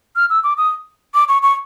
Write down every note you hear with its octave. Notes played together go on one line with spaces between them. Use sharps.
F6
E6
D6
D#6
D6
C#6
C#6